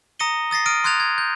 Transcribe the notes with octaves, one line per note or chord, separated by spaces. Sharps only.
A#5 D#6 A#6 C#7 D#7 G7
D#6 A6 A#6 C7
D#6 F6 D7 D#7
C6 D#6 F#6 G#6 A6 F7
G#6
G6